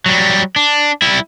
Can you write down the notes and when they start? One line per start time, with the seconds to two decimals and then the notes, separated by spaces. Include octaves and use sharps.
0.06 F#3 G3
0.56 D4
1.02 G3 E4